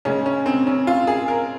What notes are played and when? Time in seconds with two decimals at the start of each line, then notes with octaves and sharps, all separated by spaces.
0.05 C#3 G#3 C#4
0.26 C#4
0.46 C4
0.67 C#4
0.87 F4
1.07 G#4
1.28 A#4